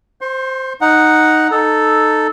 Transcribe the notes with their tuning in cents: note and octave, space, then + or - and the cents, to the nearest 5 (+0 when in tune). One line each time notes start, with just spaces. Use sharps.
C5 +0 C6 +40
D#4 +0 F#5 +0
D#4 -15 A4 +0